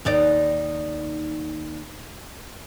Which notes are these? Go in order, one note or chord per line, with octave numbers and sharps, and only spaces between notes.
D#2 D#4 D5